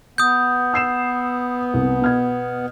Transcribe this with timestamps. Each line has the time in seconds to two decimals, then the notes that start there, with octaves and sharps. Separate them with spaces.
0.18 B3 D#6 G6
0.74 E6 C7 E7
1.74 C2
2.02 B2 F6 G#6